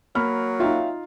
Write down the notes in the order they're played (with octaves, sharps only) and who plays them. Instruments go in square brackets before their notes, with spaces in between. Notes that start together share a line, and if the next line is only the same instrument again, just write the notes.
[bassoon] F#3 [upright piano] A#3 B5 [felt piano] F6
[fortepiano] D#4 F4 [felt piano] E5 F5 G5